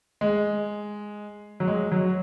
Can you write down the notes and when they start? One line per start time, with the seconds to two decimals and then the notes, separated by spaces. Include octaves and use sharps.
0.21 G#3
1.60 F#3
1.68 G#3
1.92 F#3